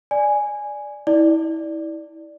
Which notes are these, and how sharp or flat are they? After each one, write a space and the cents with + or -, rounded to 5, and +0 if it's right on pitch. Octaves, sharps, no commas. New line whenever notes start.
D5 +0 G#5 +0
E4 -30 D5 +0